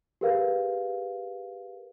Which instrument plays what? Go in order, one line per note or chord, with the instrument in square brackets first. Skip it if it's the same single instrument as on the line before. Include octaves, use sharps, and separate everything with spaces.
[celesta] G4 G#4 A#4 B4 F5